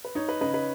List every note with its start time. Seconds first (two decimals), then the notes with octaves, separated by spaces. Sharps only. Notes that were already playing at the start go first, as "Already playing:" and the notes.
0.05 B4
0.15 D#4 C#5
0.29 B4 D#5
0.41 C#3 B4 D#5
0.53 B4 D#5